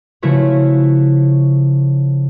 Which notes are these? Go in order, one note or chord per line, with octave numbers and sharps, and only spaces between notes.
C#3 F3 A3 E4 F#4 B4